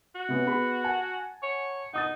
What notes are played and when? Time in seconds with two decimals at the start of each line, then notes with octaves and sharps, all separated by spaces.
0.15 F#4
0.29 C3 B3 C#4
0.47 B3 G#4 B5
0.84 F#5 G#5 A5
1.43 C#5
1.94 D#4 F#5 D#6 A6